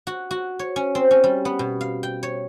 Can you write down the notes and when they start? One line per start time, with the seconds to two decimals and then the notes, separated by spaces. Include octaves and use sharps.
0.07 F#4
0.31 F#4
0.59 C#5
0.76 C#4
0.95 C4
1.11 C#4
1.24 G3
1.45 B3
1.59 B2
1.81 F5
2.03 G5
2.23 C#5